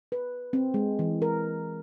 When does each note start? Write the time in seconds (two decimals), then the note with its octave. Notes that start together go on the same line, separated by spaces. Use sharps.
0.12 B4
0.53 C4
0.74 G#3
0.99 E3
1.22 A#4